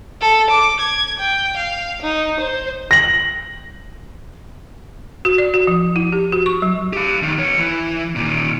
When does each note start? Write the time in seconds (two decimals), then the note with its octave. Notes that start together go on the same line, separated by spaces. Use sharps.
0.21 A4
0.50 D6
0.80 G#6
1.19 G5
1.56 F5
2.02 D#4
2.40 C5
2.91 A#6 F#7
5.25 F#4
5.38 D5
5.54 F#4
5.67 F3
5.96 E4
6.12 G4
6.32 F#4
6.46 C#6
6.62 F#3
6.93 G4 F5
7.23 E2 D#3
7.38 B3 C#5
7.59 E3
8.15 A#2 D#3